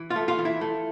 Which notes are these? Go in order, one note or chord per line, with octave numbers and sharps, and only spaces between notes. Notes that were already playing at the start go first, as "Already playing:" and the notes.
Already playing: E3
F4
A3
F4
E3
E4
A3